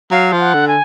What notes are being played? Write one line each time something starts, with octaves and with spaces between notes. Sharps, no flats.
F#3 F5
F3
F#5
D3
G#5